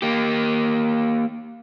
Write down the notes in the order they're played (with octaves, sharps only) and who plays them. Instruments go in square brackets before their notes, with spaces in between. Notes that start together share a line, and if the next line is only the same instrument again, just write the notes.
[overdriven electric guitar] A#3 G4